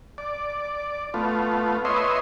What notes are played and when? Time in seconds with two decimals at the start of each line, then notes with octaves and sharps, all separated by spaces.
0.18 D5
1.14 A3 B3 F4
1.85 B4 C#5 D#5 E5 C6